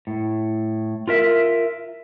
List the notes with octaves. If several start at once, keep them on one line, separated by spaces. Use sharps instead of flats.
A2
F4 A#4 E5